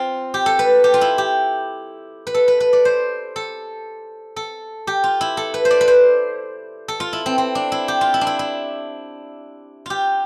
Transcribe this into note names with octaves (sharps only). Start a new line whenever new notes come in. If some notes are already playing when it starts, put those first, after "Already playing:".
Already playing: C4 F4
G4
A4
B4
G4
F4
E4
G4
B4
A4
B4
B4
D5
C5
A4
A4
G4
F4
E4
A4
B4
C5
D5
B4
C5
A4
F4
E4
C4
C4
D4
E4
G4
F4
E4
D4
E4
E4
F4 G4